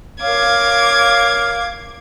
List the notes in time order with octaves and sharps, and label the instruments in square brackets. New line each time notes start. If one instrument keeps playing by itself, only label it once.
[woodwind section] A#4 C#5 F5 [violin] D6 G#6